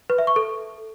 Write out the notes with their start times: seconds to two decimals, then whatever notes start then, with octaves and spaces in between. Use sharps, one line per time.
0.10 B4
0.18 E5
0.27 C#6
0.36 A4